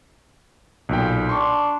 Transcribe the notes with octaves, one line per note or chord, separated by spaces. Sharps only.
B1 A#2 G5
D4 C6 C#6